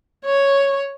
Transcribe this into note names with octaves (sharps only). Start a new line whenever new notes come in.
C#5